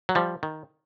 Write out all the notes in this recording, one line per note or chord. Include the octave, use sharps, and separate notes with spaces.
F#3
F3 G3
D#3